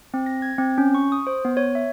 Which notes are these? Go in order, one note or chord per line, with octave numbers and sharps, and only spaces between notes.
C4
A#6
G#6
C4
C#4
C#6
D#6
C5
B3
C#5
E5